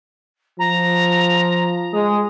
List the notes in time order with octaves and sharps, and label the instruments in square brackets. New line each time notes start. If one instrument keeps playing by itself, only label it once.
[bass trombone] F3 [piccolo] A#5
[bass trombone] G#3 [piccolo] D#6